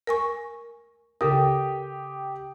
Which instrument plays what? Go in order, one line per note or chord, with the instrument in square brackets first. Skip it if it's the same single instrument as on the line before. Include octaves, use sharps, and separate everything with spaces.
[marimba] A#4 G#5 C#6
[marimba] C#3 A4 A#4 [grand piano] G4 G5 D#6